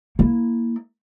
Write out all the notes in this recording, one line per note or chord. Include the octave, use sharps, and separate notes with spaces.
A#3 E4